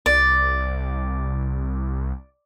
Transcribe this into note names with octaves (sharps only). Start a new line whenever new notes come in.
C2 D5